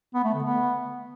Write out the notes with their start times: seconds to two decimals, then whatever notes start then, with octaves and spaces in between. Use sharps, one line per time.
0.15 B3
0.24 A3
0.34 D3
0.44 B3